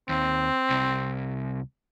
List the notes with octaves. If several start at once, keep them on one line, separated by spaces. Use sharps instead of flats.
D#2 C4
C2